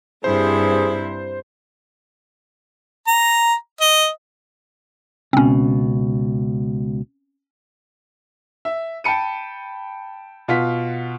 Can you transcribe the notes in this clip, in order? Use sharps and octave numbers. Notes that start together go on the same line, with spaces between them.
G2 C3 E4 G#4 C5
A#5
D#5
C#2 B2 C4 C#4
E5
G5 A5 B5 C#7 D#7
B2 F4 F#5 B6